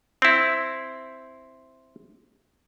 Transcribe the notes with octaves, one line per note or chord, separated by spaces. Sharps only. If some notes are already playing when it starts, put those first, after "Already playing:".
C4 E4